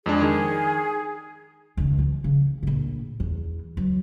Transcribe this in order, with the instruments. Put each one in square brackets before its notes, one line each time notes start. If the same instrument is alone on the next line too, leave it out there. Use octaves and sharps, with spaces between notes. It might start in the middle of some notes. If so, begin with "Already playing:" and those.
[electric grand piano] F2 G#3 D4 [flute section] G#4
[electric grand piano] D#3
[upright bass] C#2 D#3
E3 F3
C#3
A#1 A2
E2
E3 F#3